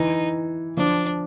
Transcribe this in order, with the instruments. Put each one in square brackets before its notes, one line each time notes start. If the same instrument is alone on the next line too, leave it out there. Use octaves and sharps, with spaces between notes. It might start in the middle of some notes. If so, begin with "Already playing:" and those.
Already playing: [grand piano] E3 [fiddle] D#4
[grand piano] F3 [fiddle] D4